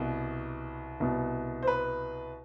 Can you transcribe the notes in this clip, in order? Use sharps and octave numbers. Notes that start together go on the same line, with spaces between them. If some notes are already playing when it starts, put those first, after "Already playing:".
Already playing: C2 B2 B4
C2 B2
C5
B4